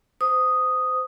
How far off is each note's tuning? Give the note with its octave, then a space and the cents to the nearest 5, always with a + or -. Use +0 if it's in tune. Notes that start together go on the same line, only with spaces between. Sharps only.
C5 -25 D#6 +0